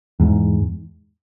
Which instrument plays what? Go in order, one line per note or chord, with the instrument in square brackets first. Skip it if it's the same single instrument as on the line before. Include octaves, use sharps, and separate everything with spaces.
[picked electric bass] E2 G#2